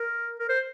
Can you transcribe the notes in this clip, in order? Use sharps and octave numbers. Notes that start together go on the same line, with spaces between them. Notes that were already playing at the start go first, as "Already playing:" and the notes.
Already playing: A#4
A#4
C5